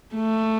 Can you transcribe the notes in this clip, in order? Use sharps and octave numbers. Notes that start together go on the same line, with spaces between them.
A3